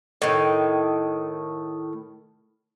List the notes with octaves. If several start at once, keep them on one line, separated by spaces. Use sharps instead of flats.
A2 D#3